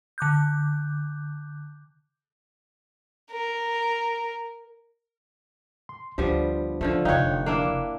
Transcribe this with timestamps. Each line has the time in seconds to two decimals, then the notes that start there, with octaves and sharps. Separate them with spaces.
0.18 D3 D6 F#6 G6
3.31 A#4
5.89 C6
6.18 D2 F3 G3 B3 D4 C5
6.81 D3 D#3 F3 A3
7.05 F1 D3 D#4 C#5 F5 G5 F#6
7.46 A#3 D4 E4